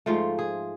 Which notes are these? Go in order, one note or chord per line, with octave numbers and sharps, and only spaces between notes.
G#2 F3 A3 F4
G#4